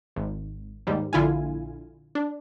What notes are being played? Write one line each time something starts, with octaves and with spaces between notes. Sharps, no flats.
G#1
D#2 G#2 G3
A#1 D3 E4 F4 F5 G#5
D4